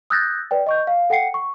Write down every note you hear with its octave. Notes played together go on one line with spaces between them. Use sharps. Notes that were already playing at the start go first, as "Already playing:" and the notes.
D#6 E6 F#6 G6 A6 A#6
B4 D5 G5
D#5 C#6 G6
F5
A4 F#5 G5 C7 C#7
C#6